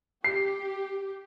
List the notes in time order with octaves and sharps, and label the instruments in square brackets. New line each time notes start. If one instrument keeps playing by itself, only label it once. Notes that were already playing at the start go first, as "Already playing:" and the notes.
[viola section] G4 [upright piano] C7